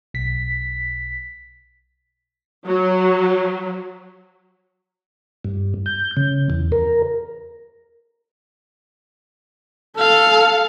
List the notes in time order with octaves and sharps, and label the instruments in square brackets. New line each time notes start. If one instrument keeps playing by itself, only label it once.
[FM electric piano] B1 B6
[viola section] F#3
[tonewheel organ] G2
G6
C#3
E2
A#4
[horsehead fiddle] A4 [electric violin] F5